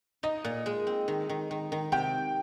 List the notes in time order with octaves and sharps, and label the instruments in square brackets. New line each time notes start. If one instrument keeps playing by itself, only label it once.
[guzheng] D#4 [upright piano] D#5
[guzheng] A#2
G#3
C4
D#3
D#3
D#3
D#3
[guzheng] C3 [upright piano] G5